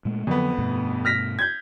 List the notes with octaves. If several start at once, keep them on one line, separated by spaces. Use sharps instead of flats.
A#2 G#3 A3
F2 D3 F#3 B3
G2 B2 A3
F6 A#6 B6
G6 G#6